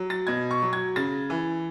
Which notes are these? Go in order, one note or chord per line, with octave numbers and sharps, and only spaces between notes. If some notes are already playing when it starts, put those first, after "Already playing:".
Already playing: F#3
A6
B2 G#6
C#6
F#3
G#6
C#3 A6
E3